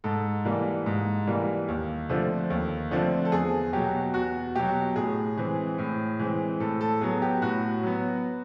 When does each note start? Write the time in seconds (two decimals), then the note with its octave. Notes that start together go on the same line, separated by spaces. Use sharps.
0.04 G#2 A4
0.45 E3 G3 A#3
0.86 G#2
1.27 E3 G3 A#3
1.68 D#2
2.09 D3 F3 A3 C4
2.50 D#2
2.91 D3 F3 A3 C4
3.25 A4
3.32 E2 G#4
3.73 B2 F#3 G4
4.14 E2 F#4
4.55 B2 F#3 G4
4.96 A2 G#4
5.37 E3 G#3 C4
5.78 A2
6.19 E3 G#3 C4
6.60 A2 A4
6.81 A4
7.01 F#3 B3 G#4
7.22 G4
7.42 A2 F#4
7.83 F#3 B3